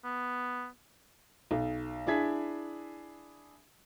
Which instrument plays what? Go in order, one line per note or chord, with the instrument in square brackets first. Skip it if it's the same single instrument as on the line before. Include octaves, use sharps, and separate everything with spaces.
[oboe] B3
[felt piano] B1
D4 E4 G#4 G#6 B6